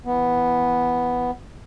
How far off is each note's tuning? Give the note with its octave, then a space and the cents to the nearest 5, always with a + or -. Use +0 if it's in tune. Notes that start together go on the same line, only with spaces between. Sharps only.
E3 +0 B3 +0